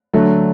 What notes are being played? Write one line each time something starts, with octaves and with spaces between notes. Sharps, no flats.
D3 F#3 A3